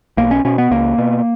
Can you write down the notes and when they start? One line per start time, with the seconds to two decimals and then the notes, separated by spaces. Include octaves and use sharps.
0.17 B1 A#3
0.31 C#4
0.45 B2 C#4
0.58 B3
0.71 C#2 A#3
0.98 B2